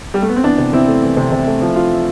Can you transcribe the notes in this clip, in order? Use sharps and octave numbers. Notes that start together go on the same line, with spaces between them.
G3
A3
B3
C4
E3 B3 D4
C3
C3 C4 E4
A3
E3
C3
C3
A3
F3
F4